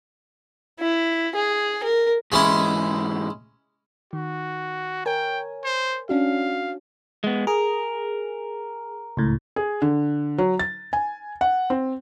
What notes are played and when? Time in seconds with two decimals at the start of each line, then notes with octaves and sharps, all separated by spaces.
0.80 E4
1.36 G#4
1.84 A#4
2.32 G#2 E3 G#3 C#4 E4
4.13 D#3 F#4
5.06 A#4 C#5 G5 G#5
5.64 C5
6.09 C#4 D4 F#4 F5
7.24 G#3 B3
7.47 G#4 A#4
9.17 C#2 A2
9.56 G#4
9.82 D3
10.38 F#3
10.59 A6
10.93 G#5
11.41 F#5
11.70 C4